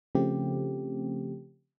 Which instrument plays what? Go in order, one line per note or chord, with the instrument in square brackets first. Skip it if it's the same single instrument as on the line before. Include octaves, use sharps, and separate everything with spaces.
[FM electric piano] C#3 F3 A3 C4 G4